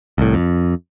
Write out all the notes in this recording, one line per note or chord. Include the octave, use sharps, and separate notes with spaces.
C2 A2
F2